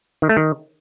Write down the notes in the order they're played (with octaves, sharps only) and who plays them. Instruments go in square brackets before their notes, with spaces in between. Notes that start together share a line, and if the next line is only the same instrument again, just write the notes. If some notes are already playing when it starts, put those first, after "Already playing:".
[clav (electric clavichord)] D#3
A3
D#3